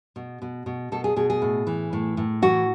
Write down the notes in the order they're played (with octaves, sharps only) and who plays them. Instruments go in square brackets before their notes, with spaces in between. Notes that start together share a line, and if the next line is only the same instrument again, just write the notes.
[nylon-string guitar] B2
B2
B2
B2 A4
G#4
B2 G#4
G#4
A2
E3
A2
A2
E3 F#4